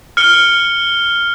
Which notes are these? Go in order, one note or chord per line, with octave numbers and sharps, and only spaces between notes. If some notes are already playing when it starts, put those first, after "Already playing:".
F6 C#7 G7